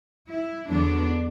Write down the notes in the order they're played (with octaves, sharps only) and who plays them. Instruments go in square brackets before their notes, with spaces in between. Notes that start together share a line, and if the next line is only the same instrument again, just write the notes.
[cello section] E4
E2 D3 F#3 B3 D4